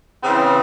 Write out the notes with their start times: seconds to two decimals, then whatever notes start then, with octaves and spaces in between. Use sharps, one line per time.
0.22 C#3 E3 C4